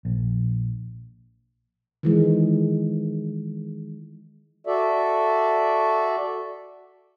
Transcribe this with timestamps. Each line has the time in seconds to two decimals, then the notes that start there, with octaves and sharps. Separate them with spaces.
0.05 A#1
2.03 D#3 E3 G#3
4.66 F#4 A4 D5 E5